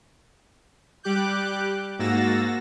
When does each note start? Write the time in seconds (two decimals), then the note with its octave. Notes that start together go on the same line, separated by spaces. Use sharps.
1.03 G3 G4 D6 F#6 G6
1.99 G#2 A#3 F#4 E6 A6 A#6